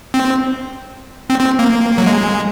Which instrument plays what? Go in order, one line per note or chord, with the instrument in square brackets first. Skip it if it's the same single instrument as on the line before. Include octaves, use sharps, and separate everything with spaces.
[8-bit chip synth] C4
C4
C4
A#3
F#3
G#3